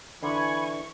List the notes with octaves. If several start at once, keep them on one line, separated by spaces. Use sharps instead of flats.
D3 E3 G#5 B5 C#6 G#6